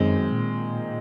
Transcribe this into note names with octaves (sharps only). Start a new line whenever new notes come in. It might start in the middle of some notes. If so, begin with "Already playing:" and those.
Already playing: F#2 D#3 G#3 C4
A#2